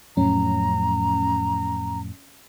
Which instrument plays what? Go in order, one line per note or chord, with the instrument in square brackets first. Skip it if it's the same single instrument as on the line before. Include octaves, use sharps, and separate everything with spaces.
[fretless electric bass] F2 A2 F#3 [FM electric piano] C#4 [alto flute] A#5